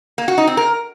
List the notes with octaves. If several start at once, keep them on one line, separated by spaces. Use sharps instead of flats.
A#3
F#4
D#4
C4
A#4